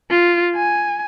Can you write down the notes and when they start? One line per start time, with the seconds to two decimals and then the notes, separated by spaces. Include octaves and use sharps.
0.10 F4
0.56 G#5